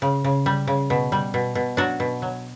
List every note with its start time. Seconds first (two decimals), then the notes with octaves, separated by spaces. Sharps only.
0.02 C#3
0.24 C#3
0.46 G3
0.67 C#3
0.90 B2
1.12 G3
1.34 B2
1.55 B2
1.77 F#3 D4 F#4
2.00 B2
2.22 F#3